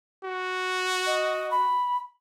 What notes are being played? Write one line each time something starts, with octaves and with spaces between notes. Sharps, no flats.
F#4
D#5
B5